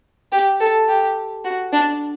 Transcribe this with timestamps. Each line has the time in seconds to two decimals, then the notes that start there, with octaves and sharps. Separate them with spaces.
0.32 G4
0.60 A4
0.88 G4
1.44 F#4
1.72 D4